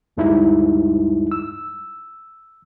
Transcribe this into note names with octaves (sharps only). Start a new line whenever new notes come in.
D2 G2 G3 G#3 D#4 E4
E6